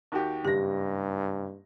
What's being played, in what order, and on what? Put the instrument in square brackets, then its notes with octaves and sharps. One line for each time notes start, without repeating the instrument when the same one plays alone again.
[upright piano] D#2 F#4 G4
[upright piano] F#1 A#6 [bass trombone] G2 [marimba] G4